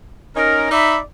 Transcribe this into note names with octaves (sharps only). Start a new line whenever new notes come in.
C#4 D#4 A#4
D#4 D5 E5 B5